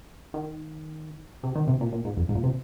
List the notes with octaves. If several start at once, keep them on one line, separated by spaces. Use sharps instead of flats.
D#3
C3
D#3
C3
A#2
A#2
G#2
F2
G#2
A#2
C3